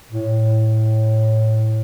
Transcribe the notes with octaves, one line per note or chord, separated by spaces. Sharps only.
A2